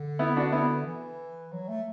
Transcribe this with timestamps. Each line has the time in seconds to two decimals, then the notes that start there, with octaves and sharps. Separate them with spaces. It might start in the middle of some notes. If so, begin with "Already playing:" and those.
Already playing: D3
0.19 B3 E4
0.37 D4 F#4
0.52 B3 E4
0.86 E3
1.52 F#3
1.69 A3